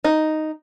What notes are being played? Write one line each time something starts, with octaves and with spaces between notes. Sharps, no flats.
D#4